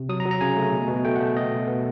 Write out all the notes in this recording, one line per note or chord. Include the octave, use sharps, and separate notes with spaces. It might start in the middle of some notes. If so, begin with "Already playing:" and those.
Already playing: C3
F#3 D#6
A#5
F#3
A#5
C#3 G#5
A3
B2
B2
A3 G5
F#5
A3
B3 D#5
B2
B3